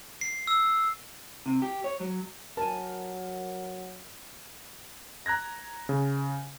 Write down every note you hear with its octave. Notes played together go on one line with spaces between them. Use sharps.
C7
E6
C3
G4
C#5
F#3
F#3 A#4 G#5 A5
A#5 F#6 G#6 A#6
C#3